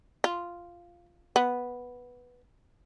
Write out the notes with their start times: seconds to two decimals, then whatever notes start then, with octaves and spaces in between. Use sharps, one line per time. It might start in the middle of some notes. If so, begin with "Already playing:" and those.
0.24 F4
1.36 B3